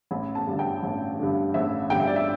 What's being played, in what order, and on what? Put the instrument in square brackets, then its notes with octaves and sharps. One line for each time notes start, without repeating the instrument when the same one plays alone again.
[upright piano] A1 B5
A5
G2 D3
G5
A1
G2 D3
A1 E5
G2 D3 G5
E5
D5
E5